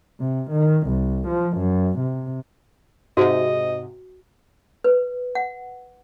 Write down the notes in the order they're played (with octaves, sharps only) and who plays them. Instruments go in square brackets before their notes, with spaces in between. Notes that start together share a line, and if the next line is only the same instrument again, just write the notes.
[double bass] C3
D#3
C2
F3
F#2
C3
[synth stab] G#2 C3 [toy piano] F#4 [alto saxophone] D#5
[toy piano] B4
F#5